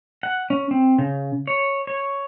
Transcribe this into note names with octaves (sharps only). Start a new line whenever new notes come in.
F#5
C#4
C4
C#3
C#5
C#5